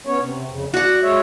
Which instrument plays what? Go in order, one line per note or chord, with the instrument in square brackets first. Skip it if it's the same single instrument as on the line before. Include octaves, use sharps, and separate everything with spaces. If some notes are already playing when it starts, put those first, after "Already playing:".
[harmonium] B3 C#4 C#5
C3
F2 C#3
[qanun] F#4 F#5 [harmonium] D5
[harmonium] G#3 C#5 E5